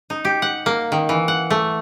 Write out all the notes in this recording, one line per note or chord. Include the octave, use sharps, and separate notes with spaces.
D#4
G4
F#5
A#3
D#3
E3
F#5
A3